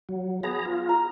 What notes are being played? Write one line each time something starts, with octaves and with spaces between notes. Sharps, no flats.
F#3
B3 G#4 A#5
F4
A#5